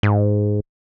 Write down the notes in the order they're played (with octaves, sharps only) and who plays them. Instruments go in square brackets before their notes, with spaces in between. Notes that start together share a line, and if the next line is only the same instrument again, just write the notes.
[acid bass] G#2